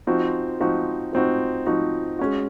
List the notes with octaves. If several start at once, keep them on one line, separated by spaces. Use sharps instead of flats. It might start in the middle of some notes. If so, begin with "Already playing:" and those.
F3 C4 D#4 F#4
F3 C4 D#4 F#4
F3 C4 D#4 F#4
F3 C4 D#4 F#4
G#3 C#4 F#4